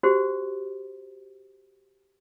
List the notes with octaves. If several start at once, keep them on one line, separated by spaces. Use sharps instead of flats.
F#4 G4 C5